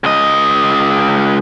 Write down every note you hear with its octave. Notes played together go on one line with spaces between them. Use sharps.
C#2 D#5